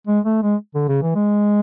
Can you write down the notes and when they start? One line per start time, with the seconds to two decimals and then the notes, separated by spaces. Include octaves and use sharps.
0.07 G#3
0.25 A3
0.42 G#3
0.75 D3
0.88 C#3
1.02 E3
1.15 G#3